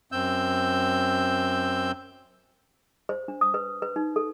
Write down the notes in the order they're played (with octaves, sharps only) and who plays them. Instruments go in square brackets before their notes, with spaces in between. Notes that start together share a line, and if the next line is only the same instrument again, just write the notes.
[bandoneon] F#2 C4 E6 G6
[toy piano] C5
D4
D#6
B4
B4
D#4
A4